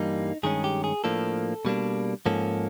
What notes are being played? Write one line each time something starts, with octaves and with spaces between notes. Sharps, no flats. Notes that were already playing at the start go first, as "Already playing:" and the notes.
Already playing: G2 E3 G3 A#3 D#4
G2 D#3 G#3 C#4 G#4
G4
G#4
A2 F3 A#3 D4 A4
B2 G3 A#3 D4
G#2 F3 A#3 C#4 A4